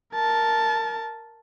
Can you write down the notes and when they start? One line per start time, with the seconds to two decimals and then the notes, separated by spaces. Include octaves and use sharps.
0.15 A#4 A5